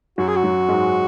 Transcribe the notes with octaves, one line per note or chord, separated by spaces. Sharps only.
F#2 F#3 F#4
G#4
F#4
F#2 F#3
G#2 G#3